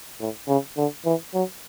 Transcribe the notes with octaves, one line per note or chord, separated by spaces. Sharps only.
A2
C#3
D3
E3
F#3